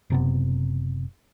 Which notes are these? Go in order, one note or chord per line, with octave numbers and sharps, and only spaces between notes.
F#1 C3 B3